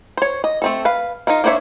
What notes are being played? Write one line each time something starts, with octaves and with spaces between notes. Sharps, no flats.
C5 C#5
D#5
A3 C4 A4
B4 F5
D#4 F4 A#4 F5
A#3 D4 C5 C#5 E5